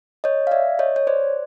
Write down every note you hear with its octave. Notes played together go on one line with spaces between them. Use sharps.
C#5 D#5
F5
D5 E5
C#5 D#5
C#5
C5 D5